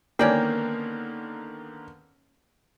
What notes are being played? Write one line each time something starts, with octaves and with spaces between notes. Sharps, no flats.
D3 D#3 A#3 B3 C#4 D5 G5